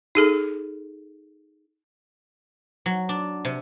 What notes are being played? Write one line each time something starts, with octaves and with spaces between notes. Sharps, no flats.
D#4 G#4 A4
F#3
D4
C3